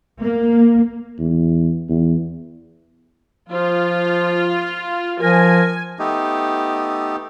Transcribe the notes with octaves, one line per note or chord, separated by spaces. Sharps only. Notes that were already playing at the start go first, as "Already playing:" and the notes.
A#3
E2
E2
F3 F4
F3 A#4 G#5
A3 B3 D#4 G4